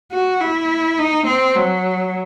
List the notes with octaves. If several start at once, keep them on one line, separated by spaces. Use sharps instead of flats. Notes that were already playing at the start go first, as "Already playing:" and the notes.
F#4
E4
D#4
C4
F#3